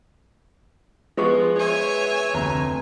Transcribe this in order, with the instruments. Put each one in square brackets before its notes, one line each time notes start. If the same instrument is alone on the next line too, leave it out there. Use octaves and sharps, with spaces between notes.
[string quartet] F3 [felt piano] G#3 B3 G#4 [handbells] F4 B4 C#6
[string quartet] C#5 E5 G#5
[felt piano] F1 D2 A#5